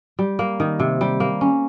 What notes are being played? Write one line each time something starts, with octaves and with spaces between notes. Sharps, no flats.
G3
A#3
D#3
C3
G3
A#3
C#4